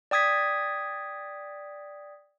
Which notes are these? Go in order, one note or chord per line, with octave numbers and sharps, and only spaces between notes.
D5 G5 D#6 G#6 B6